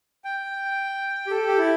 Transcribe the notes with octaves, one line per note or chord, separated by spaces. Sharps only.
G5
G4
A4
G4
E4